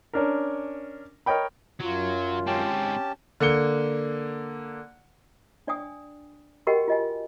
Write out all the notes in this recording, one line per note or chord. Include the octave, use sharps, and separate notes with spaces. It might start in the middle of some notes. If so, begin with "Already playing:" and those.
C#4 D4 A#4
A#4 C#5 D#5 G5 B5
F#2 F#3 F4
G#2 C4 C#4 G4 A5
D3 A#3 C#7 G7
D4 D5 G5 G#5 D#6
F#4 G4 A#4 D#5 F#5 G5
F4 D#5 G#5